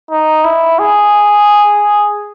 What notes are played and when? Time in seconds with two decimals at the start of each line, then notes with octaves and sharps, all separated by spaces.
0.11 D#4
0.44 E4
0.79 G#4